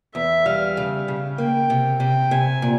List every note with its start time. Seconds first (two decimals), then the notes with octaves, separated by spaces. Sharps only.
0.15 E2 E5
0.46 G3 F5
0.77 C#3
1.08 C#3
1.38 A#3 G5
1.70 C3
2.00 C3 G5
2.31 C3 G#5
2.62 A#2